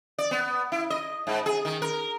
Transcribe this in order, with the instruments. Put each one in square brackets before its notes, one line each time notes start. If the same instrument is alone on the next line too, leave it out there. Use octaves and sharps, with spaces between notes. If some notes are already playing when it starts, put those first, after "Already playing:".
[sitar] D5
B3
E4
D#5
G#2
G#4
D#3
A#4